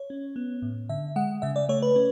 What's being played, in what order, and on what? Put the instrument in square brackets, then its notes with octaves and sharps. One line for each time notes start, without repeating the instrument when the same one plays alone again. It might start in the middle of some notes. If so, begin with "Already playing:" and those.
Already playing: [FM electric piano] C#5
C#4
B3
A2
D3 E5
G#3 F#5
C#3 E5
D5
A3 C#5
B4
C#4